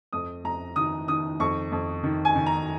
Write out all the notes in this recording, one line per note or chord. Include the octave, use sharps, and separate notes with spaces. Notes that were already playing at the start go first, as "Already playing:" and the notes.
F2 D#6
F2 A#5
D#3 D#6
D#3 D#6
F2 C#6
F2
D#3
G#5
D#3
A#5